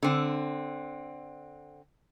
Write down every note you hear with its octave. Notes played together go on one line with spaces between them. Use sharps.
D3 C4